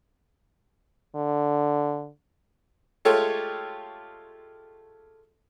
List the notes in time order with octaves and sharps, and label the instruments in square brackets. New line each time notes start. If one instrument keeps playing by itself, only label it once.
[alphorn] D3
[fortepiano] G#3 A3 F4 G4 A4 C#5